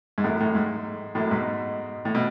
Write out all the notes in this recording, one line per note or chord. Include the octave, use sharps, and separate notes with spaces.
G#2
F#2 A2
F#2 A2
G#2
F#2 A2
G#2 B2
A2
B2